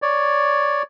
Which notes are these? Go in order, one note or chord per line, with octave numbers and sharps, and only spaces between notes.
C#5 D5